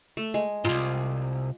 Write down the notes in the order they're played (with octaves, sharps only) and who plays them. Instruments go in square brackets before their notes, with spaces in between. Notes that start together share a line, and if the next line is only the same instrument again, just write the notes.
[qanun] A3
G#3
[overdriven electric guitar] C2 G#2 [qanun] F4